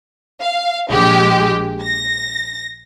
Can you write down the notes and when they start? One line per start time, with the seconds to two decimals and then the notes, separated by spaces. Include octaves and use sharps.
0.43 F5
0.90 A#1 G#3 G4
1.82 A#6